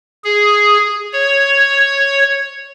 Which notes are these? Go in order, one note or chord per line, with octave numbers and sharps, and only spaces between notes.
G#4
C#5